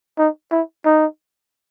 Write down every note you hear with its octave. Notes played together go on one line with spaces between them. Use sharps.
D#4
E4
D#4